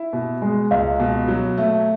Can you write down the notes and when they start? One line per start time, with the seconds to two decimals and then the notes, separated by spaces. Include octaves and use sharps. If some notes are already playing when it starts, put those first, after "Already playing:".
Already playing: E4
0.13 B2
0.42 G#3
0.71 C#2 D#5 F5
1.00 B2
1.28 F#3
1.58 A3